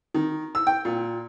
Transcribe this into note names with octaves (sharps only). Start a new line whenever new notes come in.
D#3
E6
G5
A#2